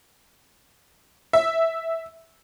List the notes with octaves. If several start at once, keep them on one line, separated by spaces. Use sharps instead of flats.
E5